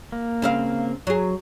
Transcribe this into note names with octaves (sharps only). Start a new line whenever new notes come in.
A#3
C#3 C4 F5
F#3 G#4